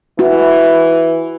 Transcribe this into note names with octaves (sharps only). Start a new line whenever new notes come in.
E3 E4 F#4